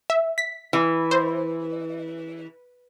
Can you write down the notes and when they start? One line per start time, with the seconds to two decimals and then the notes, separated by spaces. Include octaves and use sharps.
0.10 E5
0.38 B6
0.73 E3
1.11 C5